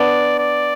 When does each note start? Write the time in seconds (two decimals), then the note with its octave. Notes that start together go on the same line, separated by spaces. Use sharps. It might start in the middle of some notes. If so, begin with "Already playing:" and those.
Already playing: B3 D4 D5
0.39 D5